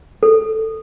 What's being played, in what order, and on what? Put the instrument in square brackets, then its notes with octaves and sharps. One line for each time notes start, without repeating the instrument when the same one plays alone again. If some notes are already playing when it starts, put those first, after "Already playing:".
[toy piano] A4